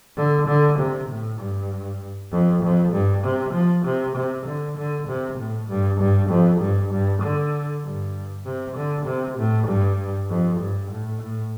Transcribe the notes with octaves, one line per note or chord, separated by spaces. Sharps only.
D3
D3
C3
A2
G2
F2
F2
G2
C3
F3
C3
C3
D3
D3
C3
A2
G2
G2
F2
G2
G2
D3
G2
C3
D3
C3
A2
G2
F2
G2
A2
A2